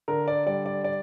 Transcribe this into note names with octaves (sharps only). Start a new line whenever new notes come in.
D3 A#4
D5
G3 D5
D5
D5